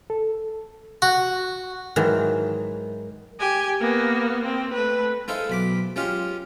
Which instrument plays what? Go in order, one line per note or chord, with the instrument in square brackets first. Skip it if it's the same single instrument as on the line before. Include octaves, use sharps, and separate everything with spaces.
[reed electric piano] A4
[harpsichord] F#4
[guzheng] G#2 D#3 E3 F#3
[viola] G4 G#5
A#3 B3
C4
A3 B4
[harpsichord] G#3 D#4 E4 A4 C5 F5
B1 B5 D6
G#3 C#4 F4 G4 F5